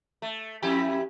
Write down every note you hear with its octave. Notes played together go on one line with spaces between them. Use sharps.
A3
F2 E4 G4